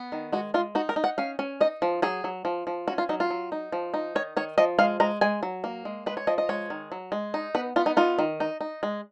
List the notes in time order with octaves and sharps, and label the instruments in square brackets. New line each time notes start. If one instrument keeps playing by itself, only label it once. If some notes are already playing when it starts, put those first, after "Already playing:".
Already playing: [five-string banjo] B3
D#3
G#3 F#4
G#3 F4
D#4 F#4
A#4
D#4
F#5
C#4 F5
C#4
D#4 D#5
F3
F#3 G#4
F#3
F3
F3
C#4 F#4
F4
F#3 D#4
F4
F#3
D#4
F3
D#4
D#3 C#5
D#3 C#5
F3 D#5
G#3 F5
G#3 A#5
G#3 G#5
F#3
A#3
G#3
G#3 B4
C#5
F3 D#5
D#5
G#3 C#5
D#3
F#3
G#3
D#4
B3 B4
B3 F4
D#4
D#4 F4
D#3
D#4
D#4
G#3